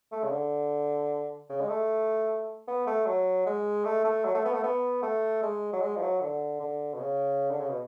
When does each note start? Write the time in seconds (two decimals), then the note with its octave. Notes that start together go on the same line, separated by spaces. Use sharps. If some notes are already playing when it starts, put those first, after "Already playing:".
0.12 A3
0.23 C#3
0.31 D3
1.49 C#3
1.61 G#3
1.69 A3
2.68 B3
2.87 A3
3.06 F#3
3.46 G#3
3.85 A3
4.04 A3
4.25 F#3
4.35 A3
4.45 B3
4.53 A3
4.63 B3
5.03 A3
5.43 G#3
5.73 F#3
5.82 G#3
5.96 F3
6.02 F#3
6.21 D3
6.60 D3
6.94 B2
6.99 C#3
7.51 D3
7.60 C#3
7.69 B2